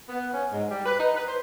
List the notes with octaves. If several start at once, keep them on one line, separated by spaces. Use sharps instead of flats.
B3
C#4
G#2
G3
B4
D#4
B4
C5